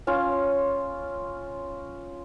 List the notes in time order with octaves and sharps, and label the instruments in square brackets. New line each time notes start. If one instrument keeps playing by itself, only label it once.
[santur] C#4 F4